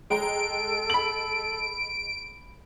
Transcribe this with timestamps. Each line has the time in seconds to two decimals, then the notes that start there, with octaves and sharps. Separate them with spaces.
0.10 G#3 A4 G5 A#5 D7
0.90 B5 F#7